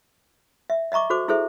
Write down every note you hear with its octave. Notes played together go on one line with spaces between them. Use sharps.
E5
D#5 E5 A#5 C#6 D6
F#4 A4 C5 D6
E4 G#4 A4 C5 E5